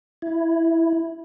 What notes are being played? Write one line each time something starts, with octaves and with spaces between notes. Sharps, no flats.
E4